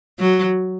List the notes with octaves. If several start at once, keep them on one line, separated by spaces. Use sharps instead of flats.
F#3